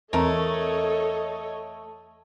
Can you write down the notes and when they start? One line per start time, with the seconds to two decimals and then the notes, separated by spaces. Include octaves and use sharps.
0.13 E2 E3 A3 C4 A4 A#4 C#5 D#5